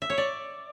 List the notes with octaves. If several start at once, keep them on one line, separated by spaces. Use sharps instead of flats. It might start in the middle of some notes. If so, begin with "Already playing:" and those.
E5
C#5
D5